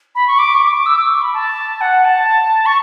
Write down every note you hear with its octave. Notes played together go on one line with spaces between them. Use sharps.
B5
C#6
D6
C#6
D6
E6
D6
C#6
B5
A5
F#5
A5
C#6